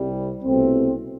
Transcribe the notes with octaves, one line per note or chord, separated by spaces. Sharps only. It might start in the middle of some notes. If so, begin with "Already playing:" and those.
Already playing: C2 C3 G3
C2 B2 A3 C4